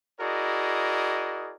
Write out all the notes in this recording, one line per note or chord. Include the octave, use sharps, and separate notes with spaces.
E4 F#4 G#4 A#4 D5 D#5